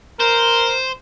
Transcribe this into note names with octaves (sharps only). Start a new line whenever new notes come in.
A#4 C5